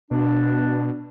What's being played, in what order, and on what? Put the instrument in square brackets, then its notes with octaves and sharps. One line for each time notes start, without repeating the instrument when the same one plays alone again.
[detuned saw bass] B2 [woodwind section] D4